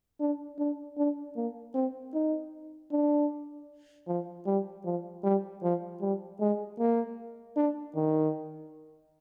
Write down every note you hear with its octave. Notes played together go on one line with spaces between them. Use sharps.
D4
D4
D4
A#3
C4
D#4
D4
F3
G3
F3
G3
F3
G3
G#3
A#3
D4
D#3